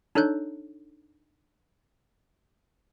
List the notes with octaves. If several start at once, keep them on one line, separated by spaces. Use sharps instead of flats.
D4 D#4 A4 C#5 F#6 G6